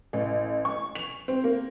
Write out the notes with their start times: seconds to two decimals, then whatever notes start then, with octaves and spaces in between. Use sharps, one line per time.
0.13 A1
0.65 C#6
0.95 F7
1.28 C4
1.44 A#3